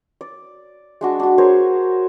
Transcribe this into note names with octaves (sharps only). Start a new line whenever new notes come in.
D5
G#3 D4 F#4
D4 F#4
G#4 A#4 C5 C#5